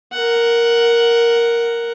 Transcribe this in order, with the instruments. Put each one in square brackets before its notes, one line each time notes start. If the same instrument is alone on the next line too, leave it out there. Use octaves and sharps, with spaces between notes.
[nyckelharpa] A#4 F#5